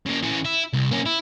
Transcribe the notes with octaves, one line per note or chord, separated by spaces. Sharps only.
C#3 A#3
E3 C#4
E4
C2
A#3 C#4
E4